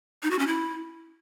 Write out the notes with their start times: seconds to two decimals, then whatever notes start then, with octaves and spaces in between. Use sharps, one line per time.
0.23 D#4
0.31 F#4
0.39 C#4
0.47 E4